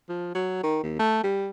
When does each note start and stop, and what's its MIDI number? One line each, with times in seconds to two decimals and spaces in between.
0.09 0.34 53
0.35 0.61 54
0.64 0.82 51
0.83 0.96 39
0.99 1.22 57
1.24 1.50 55